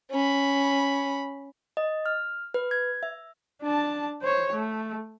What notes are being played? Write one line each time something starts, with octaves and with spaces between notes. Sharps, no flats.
C#4 B5
D#5
F6
B4
G#6
E5
D4 A5
C5 C#5
A3